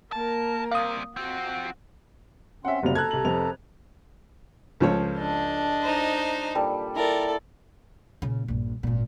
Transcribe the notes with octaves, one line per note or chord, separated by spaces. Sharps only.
A#3 A#4 A5
G3 C4 F5 D#6
C4 F4 F#4
C4 C#4 E5 F#5 C6
F#1 C3 F#3 G3 A#3 F7
A4 A5 A#5 F#6 G#6
C2 F#7
F1 F2 F7
C#2 F3 A4 C#5
D4 D#5
D#4 C5
A#2 G3 A4
E4 A4 A#4 D5
A#2 C#3
A#1 G2
G#1 A#2